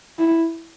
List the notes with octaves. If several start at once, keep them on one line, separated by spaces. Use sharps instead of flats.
E4